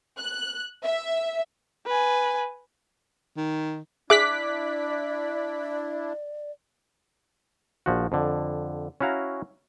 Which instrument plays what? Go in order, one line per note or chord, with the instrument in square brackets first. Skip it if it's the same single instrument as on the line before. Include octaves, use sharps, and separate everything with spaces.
[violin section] F#6
E5
[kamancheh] B4 G#5
[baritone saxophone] D#3
[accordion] D4 E4 [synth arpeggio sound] G#4 E5 [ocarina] D5 [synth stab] D6 F#6 B6
[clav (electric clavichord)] A#1 F3 F#4
F2 D3
C#4 E4 F#4 F5 A#5